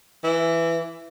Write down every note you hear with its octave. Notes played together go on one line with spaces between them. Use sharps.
E3